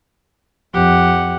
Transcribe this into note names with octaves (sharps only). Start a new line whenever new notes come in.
F2 G4 F#5